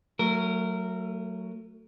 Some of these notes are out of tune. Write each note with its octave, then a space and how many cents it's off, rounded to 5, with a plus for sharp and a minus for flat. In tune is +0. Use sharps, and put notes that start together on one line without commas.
F#3 +0 A3 +20 A#4 -15